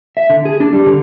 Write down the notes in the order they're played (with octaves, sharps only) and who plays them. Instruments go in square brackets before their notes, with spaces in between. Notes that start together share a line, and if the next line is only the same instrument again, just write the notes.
[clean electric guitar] E5
D3
G#4
D4
G3
D3